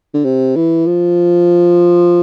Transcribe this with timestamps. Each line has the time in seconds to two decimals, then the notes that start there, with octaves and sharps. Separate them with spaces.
0.14 D3
0.25 C3
0.56 E3
0.86 F3